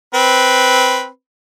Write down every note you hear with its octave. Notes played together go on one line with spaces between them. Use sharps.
C4 B4